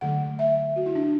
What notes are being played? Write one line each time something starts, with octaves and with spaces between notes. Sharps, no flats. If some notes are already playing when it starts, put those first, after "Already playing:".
D3 F#3 A3 F#5
E5
F#4
E4
D4